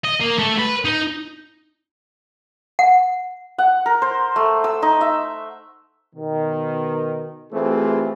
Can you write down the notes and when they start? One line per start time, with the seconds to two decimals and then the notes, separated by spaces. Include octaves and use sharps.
0.05 D#5
0.21 A#3
0.39 A3
0.59 B4
0.85 D#4
2.79 F#5
3.58 F#5
3.86 A#4
4.02 C5
4.36 A3
4.64 E6
4.82 D#4
5.01 E5
6.15 B2 D#3
7.53 E3 A3 C4 F4 G4 G#4